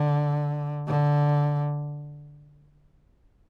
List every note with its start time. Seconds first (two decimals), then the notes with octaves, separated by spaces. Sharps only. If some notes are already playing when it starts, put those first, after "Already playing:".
Already playing: D3
0.87 D3